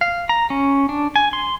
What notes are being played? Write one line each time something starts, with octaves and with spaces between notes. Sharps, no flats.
F5
A#5
C#4
D4
G#5
C6